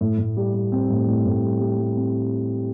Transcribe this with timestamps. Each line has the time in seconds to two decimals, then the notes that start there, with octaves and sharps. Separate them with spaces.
0.01 A2
0.18 A2
0.37 G3
0.54 G3
0.72 C4
0.90 A2
1.07 A2
1.25 A2
1.43 G3
1.61 G3
1.79 G3
1.97 C4